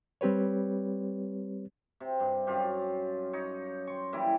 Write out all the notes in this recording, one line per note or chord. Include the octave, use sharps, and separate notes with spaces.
G3 C4 G4 B4 C#5
C3
G2
F#2 F4 G4
D#4 C#5
C6 C#6
E3 G3 A#3 E4